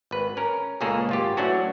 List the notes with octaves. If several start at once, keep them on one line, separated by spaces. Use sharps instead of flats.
G#1 B4
C#4 A#4
C#2 A#2 C#3 A#3 G#4 A4
G#1 F4 G4
E3 F#3 A3 C#4 D4 F#4